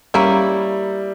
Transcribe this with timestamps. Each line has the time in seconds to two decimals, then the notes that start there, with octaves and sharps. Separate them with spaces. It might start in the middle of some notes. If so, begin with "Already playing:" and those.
0.14 G3 A#3 C#4 E4